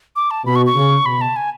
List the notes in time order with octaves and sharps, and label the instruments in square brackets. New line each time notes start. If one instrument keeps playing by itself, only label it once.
[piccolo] D6
A5
[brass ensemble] B2 [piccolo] B5
[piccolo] C#6
C#6
[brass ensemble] C#3
[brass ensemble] B2 [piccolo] B5
[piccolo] A5
G#5